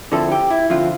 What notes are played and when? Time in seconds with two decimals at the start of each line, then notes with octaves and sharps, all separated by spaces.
0.12 D3 F3 C4 E4 A4
0.32 G4
0.50 E4
0.70 D3 F3 C4 E4 F4